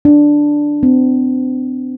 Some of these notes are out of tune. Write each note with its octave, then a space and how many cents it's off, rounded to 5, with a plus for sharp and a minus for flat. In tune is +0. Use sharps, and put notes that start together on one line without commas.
D4 +0
C4 -45